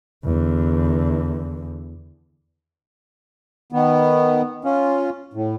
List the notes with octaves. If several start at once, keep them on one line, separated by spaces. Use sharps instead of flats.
E2 D3
D#3 B3
C#4 F4
A2